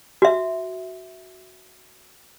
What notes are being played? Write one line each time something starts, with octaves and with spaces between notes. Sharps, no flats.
F#4 E5